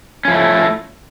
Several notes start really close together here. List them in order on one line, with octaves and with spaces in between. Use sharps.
C#4 F3 E4 A3 A4